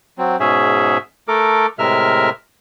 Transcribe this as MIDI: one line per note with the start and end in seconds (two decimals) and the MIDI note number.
0.18 0.36 54
0.18 0.36 60
0.40 0.98 44
0.40 0.98 47
0.40 0.98 61
0.40 0.98 68
0.40 0.98 76
1.28 1.66 57
1.28 1.66 69
1.28 1.66 70
1.28 1.66 86
1.79 2.30 45
1.79 2.30 48
1.79 2.30 56
1.79 2.30 70
1.79 2.30 76
1.79 2.30 89